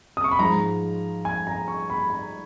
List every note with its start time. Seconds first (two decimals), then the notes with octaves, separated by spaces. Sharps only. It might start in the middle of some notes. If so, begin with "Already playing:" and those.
0.17 D#6
0.24 C#6
0.31 B5
0.39 G#2 F3 G#3 A#5
1.25 G#5
1.47 A#5
1.68 C#6
1.90 B5
2.10 A#5